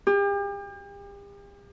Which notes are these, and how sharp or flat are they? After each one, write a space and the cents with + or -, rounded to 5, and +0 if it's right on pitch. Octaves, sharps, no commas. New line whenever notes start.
G4 +40